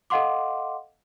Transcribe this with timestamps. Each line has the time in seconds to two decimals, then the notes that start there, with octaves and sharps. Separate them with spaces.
0.10 A4 D#5 F5 F#5 C6 D6